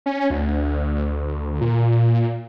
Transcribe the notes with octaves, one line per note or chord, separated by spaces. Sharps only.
C#4
D2
A#2